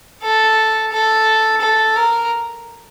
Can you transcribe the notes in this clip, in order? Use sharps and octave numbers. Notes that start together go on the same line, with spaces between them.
A4
A4
A4
A#4